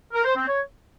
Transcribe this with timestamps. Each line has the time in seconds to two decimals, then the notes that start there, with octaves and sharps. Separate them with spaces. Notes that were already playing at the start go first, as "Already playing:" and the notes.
0.13 A#4
0.24 C5
0.36 C4
0.47 C#5